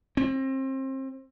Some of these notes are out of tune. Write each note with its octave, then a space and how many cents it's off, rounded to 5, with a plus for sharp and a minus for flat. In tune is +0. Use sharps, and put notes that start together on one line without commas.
C4 +30